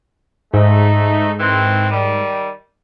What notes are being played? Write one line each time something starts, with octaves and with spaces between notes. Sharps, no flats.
G#2 A3 D#4
D#3 E3 C4
D#3 G3